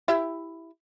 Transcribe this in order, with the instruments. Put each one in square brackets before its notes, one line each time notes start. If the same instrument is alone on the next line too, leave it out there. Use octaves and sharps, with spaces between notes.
[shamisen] E4 G4 E5